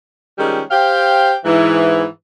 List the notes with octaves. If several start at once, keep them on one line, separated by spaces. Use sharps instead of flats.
D#3 F3 G3 G#3 C#4
G4 C5 F5 G5
G#2 E3